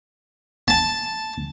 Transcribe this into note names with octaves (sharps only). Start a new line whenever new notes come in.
A5